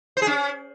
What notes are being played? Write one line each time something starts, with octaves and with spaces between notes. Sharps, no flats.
C5
G#4
C#4